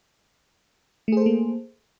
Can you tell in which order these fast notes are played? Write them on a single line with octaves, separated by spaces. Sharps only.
A3 G#4 C5 A4 A#3